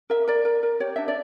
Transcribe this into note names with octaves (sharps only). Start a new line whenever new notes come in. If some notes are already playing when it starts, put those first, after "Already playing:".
A#4 E5
A#4 D5
A#4
A#4
G4 C#5
D4 E5
D5